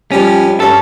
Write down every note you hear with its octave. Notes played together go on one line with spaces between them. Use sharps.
G#2 F3 G3 C#4
G2 C#4 A4